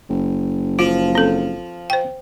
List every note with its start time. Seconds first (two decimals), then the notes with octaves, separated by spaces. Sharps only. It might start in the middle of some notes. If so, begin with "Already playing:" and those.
0.09 F#1
0.79 F3 F4
1.15 C4 A4
1.90 C5 G5